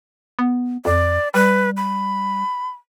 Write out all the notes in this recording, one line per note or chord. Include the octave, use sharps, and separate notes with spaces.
B3
F2 D5
G3 B4
B5